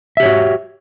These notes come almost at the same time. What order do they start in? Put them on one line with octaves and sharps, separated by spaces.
E5 G4 C#5 F#4